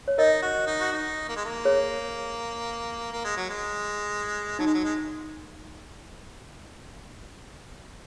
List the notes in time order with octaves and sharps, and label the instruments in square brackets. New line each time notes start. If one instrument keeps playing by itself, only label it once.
[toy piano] C#5
[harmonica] D#4 [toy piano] A#4 D#5
[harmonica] F#4
D#4
F#4
D#4
A#3
G#3
A#3
[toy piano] G#4 C#5
[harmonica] A#3
G#3
F#3
G#3
[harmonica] F#3 [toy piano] D#4
[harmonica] G#3
F#3
G#3